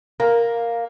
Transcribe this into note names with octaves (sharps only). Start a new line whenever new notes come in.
A#3 A#4